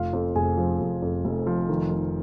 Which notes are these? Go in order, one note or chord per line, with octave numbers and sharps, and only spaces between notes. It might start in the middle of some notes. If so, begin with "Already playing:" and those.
Already playing: F1 F4 F5
F2
F1 G#4 G#5
F3
F1
F2
F1
F3
D#3
D#3